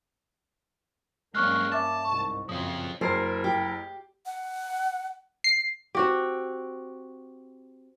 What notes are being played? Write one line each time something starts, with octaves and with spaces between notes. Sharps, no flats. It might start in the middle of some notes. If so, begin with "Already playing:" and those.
G2 F#3 G#3 A#3 C#4 C#6 F6 F#6
E5 A5 D6 A6
C2 G#2 C#6
A#1 F#2 C#3 F3 C4 D#6
F#1 E4 A#4 C5 C7
G4
F#5
C7
C4 F#4 G4